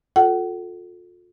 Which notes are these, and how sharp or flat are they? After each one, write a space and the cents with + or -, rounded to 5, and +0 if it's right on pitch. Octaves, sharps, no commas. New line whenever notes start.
F4 +35 A4 +0 F#5 +35